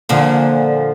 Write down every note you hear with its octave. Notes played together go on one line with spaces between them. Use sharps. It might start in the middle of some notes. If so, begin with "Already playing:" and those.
A#2 D3 F3